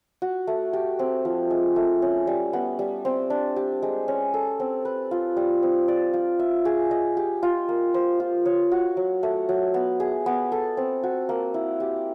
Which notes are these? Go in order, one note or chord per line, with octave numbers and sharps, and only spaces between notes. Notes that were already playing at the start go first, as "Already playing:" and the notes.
F#4
A3
G4
C4
F3
G#3
A3
C#4
G3
B3
G3
C4
D4
G4
G#3
C#4
A4
C4
B4
F4
G3
C4
D5
F4
E5
G#4
D#5
G4
F4
A#3
C5
F4
C#5
F#4
F#3
A3
F#3
B3
G#4
B3
A4
C4
F#4
A#3
E4
G4